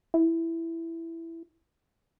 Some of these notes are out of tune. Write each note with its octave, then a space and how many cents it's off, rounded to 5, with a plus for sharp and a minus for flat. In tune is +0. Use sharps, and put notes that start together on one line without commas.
E4 +5